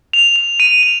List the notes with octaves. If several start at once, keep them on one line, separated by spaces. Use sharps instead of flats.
F7
F7
D#7
F7